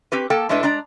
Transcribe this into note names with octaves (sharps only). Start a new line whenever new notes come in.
C4 G4 B4
A#3 A4 G5 A5
A2 G#3 D4 E4 A4 B4
G#3 D4 D5 A#5